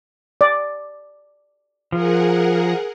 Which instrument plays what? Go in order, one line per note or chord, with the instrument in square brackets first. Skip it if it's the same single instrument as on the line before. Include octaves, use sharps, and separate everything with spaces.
[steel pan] D5
[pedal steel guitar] F3 [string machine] G#4 A#4 F#5